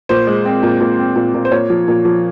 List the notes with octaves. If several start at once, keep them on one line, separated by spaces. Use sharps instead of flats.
A#2 C5
G#3
C4
A#2
A#2
C4
A#2
A#2
C5
A#2 C#5
F3
A#2
F3